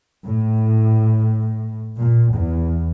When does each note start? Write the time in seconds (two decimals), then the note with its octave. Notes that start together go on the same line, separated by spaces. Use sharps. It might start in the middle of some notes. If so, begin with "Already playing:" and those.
0.24 A2
2.00 A#2
2.36 E2